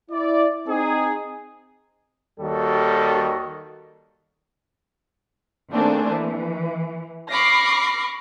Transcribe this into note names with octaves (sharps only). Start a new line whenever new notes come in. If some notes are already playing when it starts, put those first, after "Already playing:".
E4 D5
C4 D#4 G#4
D#2 D#3 G3 F#4 A4
D#3 A3 A#3 C4 D4 G#4
E3
B5 C#6 D6 F6 A#6 C7